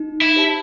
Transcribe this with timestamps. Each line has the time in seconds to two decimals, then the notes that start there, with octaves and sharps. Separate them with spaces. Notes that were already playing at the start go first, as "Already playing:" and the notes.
Already playing: D#4
0.21 E4
0.36 G4 C5 E5 A5